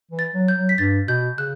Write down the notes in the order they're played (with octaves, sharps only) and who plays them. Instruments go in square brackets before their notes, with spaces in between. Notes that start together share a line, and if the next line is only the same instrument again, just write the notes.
[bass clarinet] E3
[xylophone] A6
[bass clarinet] F#3
[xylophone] G6
[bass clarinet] F#3
[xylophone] B6
[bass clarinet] G2 [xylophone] A6
[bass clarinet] B2 [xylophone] G6
[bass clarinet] C#3 [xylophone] F#6